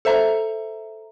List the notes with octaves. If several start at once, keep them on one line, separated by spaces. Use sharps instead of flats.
A4 C5 E5 A#5